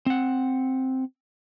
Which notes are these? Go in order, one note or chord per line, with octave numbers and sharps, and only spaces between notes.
C4 F#5